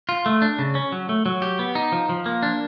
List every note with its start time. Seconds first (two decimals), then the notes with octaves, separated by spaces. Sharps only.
0.09 F4
0.26 A3
0.42 D4
0.59 C#3
0.75 C#4
0.92 F#3
1.09 A3
1.26 F#3
1.42 G4
1.59 B3
1.75 D#4
1.92 F3
2.09 F3
2.26 A#3
2.43 D4